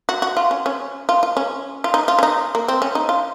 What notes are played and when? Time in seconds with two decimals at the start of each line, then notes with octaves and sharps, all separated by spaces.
0.09 F#4
0.22 F#4
0.37 F4
0.51 C#4
0.66 C#4
1.09 F4
1.23 F4
1.37 C#4
1.84 F4
1.94 D#4
2.08 F4
2.19 C#4
2.23 D#4
2.55 A#3
2.68 C4
2.82 C#4
2.95 D#4
3.09 F4